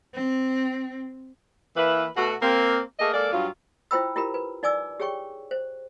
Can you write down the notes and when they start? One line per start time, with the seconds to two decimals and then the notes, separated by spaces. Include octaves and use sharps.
0.14 C4
1.76 E3 A#3 E4 B4
2.17 B2 A3 F#4
2.42 A#3 C4
2.99 A3 A#3 G#4 A#4 D#5
3.14 G#3 A#3 A4 D5
3.33 G2 F#3 F4
3.91 E4 F4 C5 G5 B5 E6
4.16 E4 F4 G4 A#4 A#5 B5
4.34 B4
4.63 D#4 D5 G#5 D6 E6
5.00 G4 G#4 C#5 G5 C#6
5.51 C5